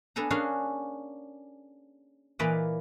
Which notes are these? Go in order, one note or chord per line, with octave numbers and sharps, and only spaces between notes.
B3 D4 A4 G#5 A#5
A#3 C#4 D4 F#4 G#4 F5
A#2 E3 A#3 B4 D5 D#5